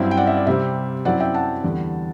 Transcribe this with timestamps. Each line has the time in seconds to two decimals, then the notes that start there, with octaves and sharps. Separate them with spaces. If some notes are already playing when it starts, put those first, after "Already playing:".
Already playing: G2 F#3 C4 E4 E5 G5
0.11 G5
0.17 D5 F#5
0.27 E5
0.37 D5
0.47 C3 G3 C4 E5
1.05 F#2 F#3 C4 E4 D5 F#5
1.20 E5 G5
1.34 F#5 A5
1.64 E2 D3 G3